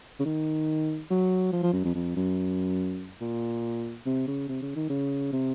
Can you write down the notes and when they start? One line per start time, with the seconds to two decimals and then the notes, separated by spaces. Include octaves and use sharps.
0.20 C#3
0.25 D#3
1.11 F#3
1.53 F3
1.63 F3
1.73 F#2
1.85 F2
1.95 F2
2.17 F#2
3.21 A#2
4.06 C3
4.28 C#3
4.49 C3
4.62 C#3
4.76 D#3
4.90 C#3
5.33 C3